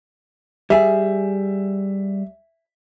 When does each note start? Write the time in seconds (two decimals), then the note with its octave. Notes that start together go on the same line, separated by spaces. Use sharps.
0.70 G3 G#4 E5